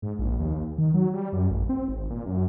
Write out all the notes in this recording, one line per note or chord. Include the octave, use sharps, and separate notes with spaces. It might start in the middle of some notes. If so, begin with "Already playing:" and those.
G#2
A#1
D#2
D#3
F#3
G3
F#2
A1
C4
G#1
A#2
F#2